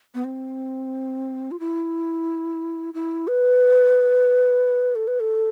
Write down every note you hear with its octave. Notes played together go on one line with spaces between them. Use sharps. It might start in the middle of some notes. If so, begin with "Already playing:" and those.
B3
C4
F4
E4
E4
B4
A4
B4
A4